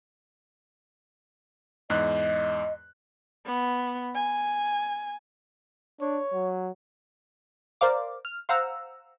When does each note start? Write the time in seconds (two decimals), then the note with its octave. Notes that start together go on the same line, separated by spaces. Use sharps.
1.90 E2 G#2 D#5 F#6
3.46 B3
4.15 G#5
6.01 D4 C#5
6.34 F#3
7.81 A#4 C5 D5 F5 D6
8.25 F6
8.49 C5 F5 F#5 A#5 E6